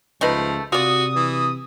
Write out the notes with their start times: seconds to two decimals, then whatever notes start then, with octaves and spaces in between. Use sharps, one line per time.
0.21 C#2 F3 A3 D#4 B4
0.72 C3 F4 F#4 D5 D#6
1.15 E3